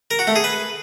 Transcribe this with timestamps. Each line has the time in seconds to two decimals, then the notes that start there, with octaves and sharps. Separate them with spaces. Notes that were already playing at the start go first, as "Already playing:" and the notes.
0.11 A#4
0.19 F#4
0.27 A3
0.36 G#4
0.44 B4